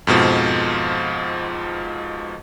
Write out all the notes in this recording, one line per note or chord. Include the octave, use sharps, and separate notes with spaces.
F2 G#2 B2 F3